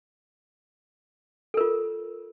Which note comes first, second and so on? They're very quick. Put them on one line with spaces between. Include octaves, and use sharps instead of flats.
A4 A#4 F4